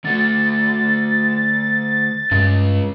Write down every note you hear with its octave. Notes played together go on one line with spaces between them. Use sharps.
D3 A3 A6
G2 C#3 G#3